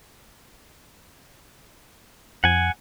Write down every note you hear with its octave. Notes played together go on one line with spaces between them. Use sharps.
F2 F#5 G#5